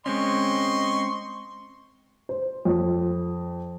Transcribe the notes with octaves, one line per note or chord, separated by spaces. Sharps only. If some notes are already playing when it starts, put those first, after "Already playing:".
G#3 C4 C#4 D#5 C6 C#6
C5
F2